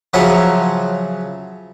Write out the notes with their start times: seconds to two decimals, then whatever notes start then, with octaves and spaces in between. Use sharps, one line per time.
0.13 C#3 F3 F#3 F4 E5 F#5